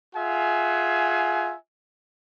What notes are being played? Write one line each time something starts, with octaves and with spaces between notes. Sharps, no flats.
F4 G#4 E5 F#5 G#5